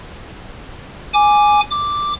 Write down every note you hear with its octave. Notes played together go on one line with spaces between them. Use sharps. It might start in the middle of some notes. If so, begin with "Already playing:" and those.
G#5 D6
D6